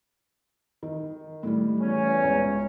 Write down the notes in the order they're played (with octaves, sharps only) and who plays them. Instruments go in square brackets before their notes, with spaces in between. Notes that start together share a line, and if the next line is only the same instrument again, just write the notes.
[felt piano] D#3
A2 G3
[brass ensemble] E2 C#4
[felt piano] C#2